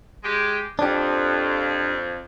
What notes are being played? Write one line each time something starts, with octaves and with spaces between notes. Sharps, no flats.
G#3 G4
F2 D4 G4